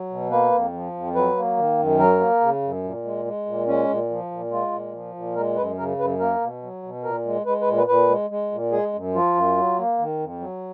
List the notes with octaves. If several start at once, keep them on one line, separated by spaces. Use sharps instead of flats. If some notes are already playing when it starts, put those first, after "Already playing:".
Already playing: F#3
B2
A#3 B4
F2
F3
F2
F#3 B4
A#3
D#3
F#2
F#3 A#4
A#3
C#3
F#2
A#2
G#3
G#3
A#2
G#3 C#4
A#2
F3
A#2
G#3 F4
A#2
F3
A#2
G#3 A#4
F#2 B4
C#3 A#4
F#2 B4
A#3 A#4
B2
F#3
B2
A#2 A#4
G#3
G#3 B4
B4
A#2
B4
A#2 B4
G#3
G#3
A#2
G#3 G#4
F#2
F3 F4
F#2
F#3
A#3
D#3
F2
F#3